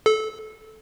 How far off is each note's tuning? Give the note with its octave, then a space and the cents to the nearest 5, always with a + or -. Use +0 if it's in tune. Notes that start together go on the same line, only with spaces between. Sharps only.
A4 -20